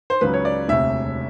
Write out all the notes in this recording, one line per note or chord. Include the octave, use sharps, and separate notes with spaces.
C5
C#2 C#3 F#3 B4
C#5
D5
E1 D2 C3 E5